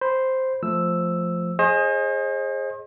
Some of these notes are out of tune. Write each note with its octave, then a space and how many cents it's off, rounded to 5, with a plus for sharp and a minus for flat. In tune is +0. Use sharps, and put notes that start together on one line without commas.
C5 +0 B5 +0
F3 +0 A3 +0 E6 +0
G#4 +5 C5 +40 D#5 +0